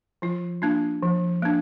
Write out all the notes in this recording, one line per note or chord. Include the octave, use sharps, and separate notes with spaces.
F3 F4
A#3 D4 F4
F3
A#3 D4